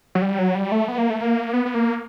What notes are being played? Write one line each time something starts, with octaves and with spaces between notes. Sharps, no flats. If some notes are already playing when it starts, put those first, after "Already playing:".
F#3
G3
F#3
G3
A3
B3
A#3
A3
A#3
B3
B3
A#3